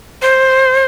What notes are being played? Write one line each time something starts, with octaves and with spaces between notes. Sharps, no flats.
C5